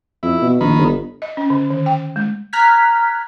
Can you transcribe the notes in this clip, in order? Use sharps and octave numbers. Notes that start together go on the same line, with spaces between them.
F2 E4
B2
A#1 D#3 B5
G1
D#5
C#4
D3
D#3
G5
G#3
A#5 F6 F#6 G#6 B6